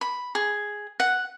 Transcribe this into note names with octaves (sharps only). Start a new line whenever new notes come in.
B5
G#4
F#5